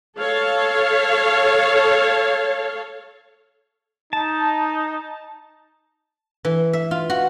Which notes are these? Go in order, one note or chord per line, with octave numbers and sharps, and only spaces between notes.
A4 C#5 F5
D#4 A5
E3
E5
F4
F#4